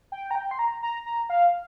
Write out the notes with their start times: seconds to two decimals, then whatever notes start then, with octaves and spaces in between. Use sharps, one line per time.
0.12 G5
0.31 A#5
0.35 G5
0.51 C6
0.59 A#5
0.83 A#5
1.06 A#5
1.30 F5